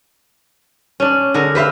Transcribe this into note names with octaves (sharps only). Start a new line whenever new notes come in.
C#4 D4
D3 G#4 A#4
B4 C5 E5 F5